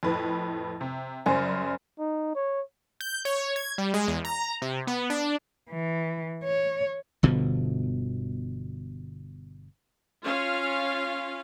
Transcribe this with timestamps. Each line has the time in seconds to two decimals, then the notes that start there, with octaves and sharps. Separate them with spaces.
0.03 F2 A2 B4
0.81 C3
1.26 F#2 C#3 G3 C5 G#5
1.99 D#4
2.35 C#5
3.00 G6
3.25 C#5
3.56 G#6
3.78 G3
3.94 G#3
4.08 E2
4.25 A#5
4.62 C3
4.87 B3
5.10 D4
5.71 E3
6.44 C#5
7.23 G1 B2 D3 F3
10.24 C#4 F4 F5